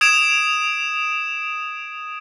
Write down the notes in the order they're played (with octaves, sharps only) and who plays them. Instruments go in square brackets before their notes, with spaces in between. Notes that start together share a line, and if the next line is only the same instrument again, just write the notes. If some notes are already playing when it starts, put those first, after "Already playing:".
[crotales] D#6 G#6 D7 E7